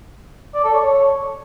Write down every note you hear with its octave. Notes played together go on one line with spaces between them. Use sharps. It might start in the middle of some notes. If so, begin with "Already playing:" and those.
D5
A4
C#5